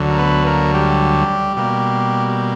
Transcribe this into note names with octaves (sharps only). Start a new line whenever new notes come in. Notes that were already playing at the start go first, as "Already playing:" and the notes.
Already playing: D2 D3 F#3
A#4
B3 B4
A#3 A#4
G3 G4
B2 G3 A#3